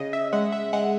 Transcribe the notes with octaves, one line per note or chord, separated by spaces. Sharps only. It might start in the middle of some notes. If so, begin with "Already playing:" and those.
Already playing: C#3 D#5
E5
G#3 F#5
E5
G#3 F#5